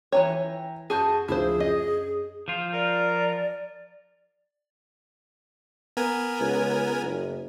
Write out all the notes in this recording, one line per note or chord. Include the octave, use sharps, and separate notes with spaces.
E3 C#4 C#5 E5 G5 A#5
F#2 F#4 G#4 A5 G6
D2 C#3 F3 E4 G#4 C5
F#2 D#5
F3 F4 G6
A#4 D5
B3 A#4 G#5
C#2
F#1